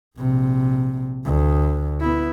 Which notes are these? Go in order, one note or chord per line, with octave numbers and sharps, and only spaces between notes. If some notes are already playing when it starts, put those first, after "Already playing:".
A#1 C3
D2
B3 E4